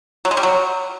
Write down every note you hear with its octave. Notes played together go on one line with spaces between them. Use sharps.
F#3
G#3
G3
F#3